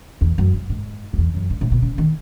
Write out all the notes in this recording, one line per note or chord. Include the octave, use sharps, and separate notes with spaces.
E2
F#2
G#2
G#2
F#2
E2
F#2
G#2
A2
B2
C#3
D#3